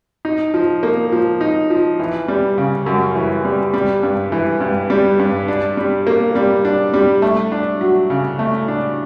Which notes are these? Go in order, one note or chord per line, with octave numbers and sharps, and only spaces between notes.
D#4
F3
A#3
F3
D#4
F3
E3
G3
C#3
F#2
E3
G3
G3
G2
E3
G2
G3
G2
D4
G3
A#3
G3
D4
G3
A3
D4
F#3
C#3
A3
D4